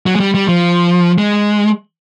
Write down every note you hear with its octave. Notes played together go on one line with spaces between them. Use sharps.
F#3
G#3
G3
G3
F3
G#3